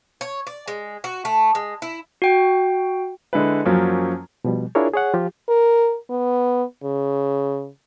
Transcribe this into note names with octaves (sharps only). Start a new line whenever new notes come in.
C#5
D5
G#3
F#4
A3
G#3
E4
F#4 G5
D3 G#3 E4 B4
F#2 F3 F#3 A#3 C#4
B2 F3 G3
D4 E4 F4 G#4 A#4 C#5
G#4 C#5 F#5
F3 F4 G4
A#4
B3
C#3